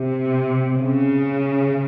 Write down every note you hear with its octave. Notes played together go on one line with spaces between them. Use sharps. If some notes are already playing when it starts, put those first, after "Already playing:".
Already playing: C3
C#3